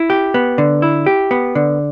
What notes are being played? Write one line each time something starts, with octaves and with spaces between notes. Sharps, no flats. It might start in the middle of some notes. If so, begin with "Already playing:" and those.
Already playing: E4
G4
B3
D3
E4
G4
B3
D3